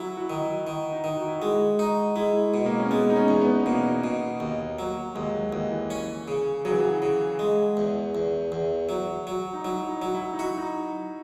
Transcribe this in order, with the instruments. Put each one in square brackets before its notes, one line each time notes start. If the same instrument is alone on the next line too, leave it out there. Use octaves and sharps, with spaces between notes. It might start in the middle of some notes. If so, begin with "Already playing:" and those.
Already playing: [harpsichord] F#3 [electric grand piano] E4
[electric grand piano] F#4
[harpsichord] D#3
[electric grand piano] E4
[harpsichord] D#3
[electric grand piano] D#4
[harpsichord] D#3
[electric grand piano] F#4
E4
[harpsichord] G#3 [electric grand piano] F#4
[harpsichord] D#4
[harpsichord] G#3 [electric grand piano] E4
[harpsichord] B2
[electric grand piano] A#3
C#4
[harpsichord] G#3 [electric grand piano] B3
[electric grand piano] D#4
C#4
[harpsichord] E2
[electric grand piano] B3
[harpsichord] B2 [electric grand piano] A#3
[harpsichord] B2
D#2
F#3
[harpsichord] D#2 [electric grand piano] G#3
[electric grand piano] F#3
[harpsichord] D#2 [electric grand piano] E3
[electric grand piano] E3
[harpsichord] C#4
C#3
[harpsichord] C#3 [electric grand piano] F#3
[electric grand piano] E3
F#3
[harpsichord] C#3
G#3
E2
E2
E2
F#3
F#3
[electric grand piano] D#4
[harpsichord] F#3 [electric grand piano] E4
[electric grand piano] D#4
[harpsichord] F#3
[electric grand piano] E4
D#4
[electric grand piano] E4 [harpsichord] F#4
[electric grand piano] D#4